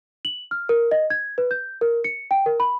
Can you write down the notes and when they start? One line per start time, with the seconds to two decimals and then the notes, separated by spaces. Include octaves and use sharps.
0.25 F#7
0.51 F6
0.69 A#4
0.91 D#5
1.10 G#6
1.38 B4
1.51 G6
1.81 A#4
2.04 C#7
2.31 G5
2.46 A#4
2.60 B5